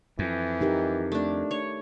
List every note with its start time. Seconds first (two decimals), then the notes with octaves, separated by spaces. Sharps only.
0.19 F2 E3
0.61 D#4 G4 A#4
1.12 A3 D4
1.51 C#5